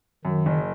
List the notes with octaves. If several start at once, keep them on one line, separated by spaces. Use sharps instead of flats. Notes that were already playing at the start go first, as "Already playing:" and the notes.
F#2 D#3
F#1